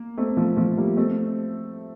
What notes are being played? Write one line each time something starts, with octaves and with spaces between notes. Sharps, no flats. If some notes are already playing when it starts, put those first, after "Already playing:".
Already playing: A#3
A3 C4
F3 A3
F3 A3
G3 A#3
A3 C4